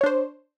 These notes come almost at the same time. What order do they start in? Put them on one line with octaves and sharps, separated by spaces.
C#5 D4 C5